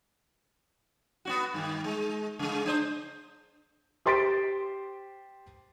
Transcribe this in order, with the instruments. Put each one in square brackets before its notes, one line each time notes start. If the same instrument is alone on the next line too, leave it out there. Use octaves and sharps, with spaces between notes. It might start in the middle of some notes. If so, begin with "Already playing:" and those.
[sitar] B3 C#4 F#4
G2 D#3
G#3
C#3 G#3
D4 C5
[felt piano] G4 C5 C6 A6 B6 D7